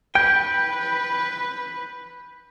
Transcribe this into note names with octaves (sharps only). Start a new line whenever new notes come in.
B4 G5 G6